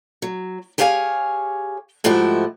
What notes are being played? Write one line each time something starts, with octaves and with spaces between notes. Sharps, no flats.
F#3
G4 G#4 C#5 F5 G5 G#5
G#2 F3 A3 E4 F#4 G4